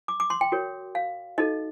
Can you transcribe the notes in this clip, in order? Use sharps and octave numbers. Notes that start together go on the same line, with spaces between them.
D6
D6
C6
G5
F#4 A#4 C#5
F5
D#4 F#4 A4 D#5